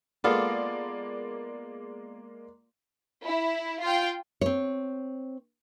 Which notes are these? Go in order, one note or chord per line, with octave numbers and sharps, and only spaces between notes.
G#3 A#3 B3 F4 A4 D5
E4
F4 G5
C4 C#5